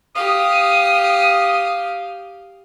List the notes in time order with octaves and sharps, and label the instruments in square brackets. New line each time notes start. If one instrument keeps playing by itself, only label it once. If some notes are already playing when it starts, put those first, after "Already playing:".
[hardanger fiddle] G4 F5 [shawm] D#6